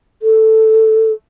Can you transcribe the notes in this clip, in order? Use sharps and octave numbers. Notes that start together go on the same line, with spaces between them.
A4